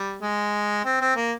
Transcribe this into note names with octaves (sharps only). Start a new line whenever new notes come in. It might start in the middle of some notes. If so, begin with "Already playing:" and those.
Already playing: G3
G#3
C4
C4
A#3